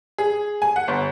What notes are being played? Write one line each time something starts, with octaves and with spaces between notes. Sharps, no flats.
G#4
G#5
F#5
G1